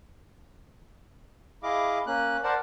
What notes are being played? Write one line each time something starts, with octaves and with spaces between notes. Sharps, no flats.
E4 G#4 D#5 F5 D6
A#3 C#4 F#6
A#4 C5 D5 F#5 A5